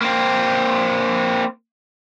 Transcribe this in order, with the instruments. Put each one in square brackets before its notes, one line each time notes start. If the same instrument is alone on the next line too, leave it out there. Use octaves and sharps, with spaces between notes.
[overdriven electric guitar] A#3 C4